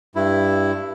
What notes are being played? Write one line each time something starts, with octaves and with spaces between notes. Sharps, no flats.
G2 E4